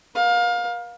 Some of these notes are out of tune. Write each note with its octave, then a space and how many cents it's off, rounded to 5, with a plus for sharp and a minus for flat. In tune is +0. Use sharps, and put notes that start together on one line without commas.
A#4 +45 F5 +25